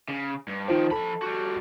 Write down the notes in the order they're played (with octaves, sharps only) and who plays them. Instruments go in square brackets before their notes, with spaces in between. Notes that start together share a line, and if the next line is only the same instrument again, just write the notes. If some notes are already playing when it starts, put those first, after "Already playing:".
[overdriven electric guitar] C#3
G2
[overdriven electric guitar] D#3 F3 [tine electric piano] D#4 F4 C5
[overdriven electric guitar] F3 B5 [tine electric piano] A4 A5
[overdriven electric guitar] G3 F#4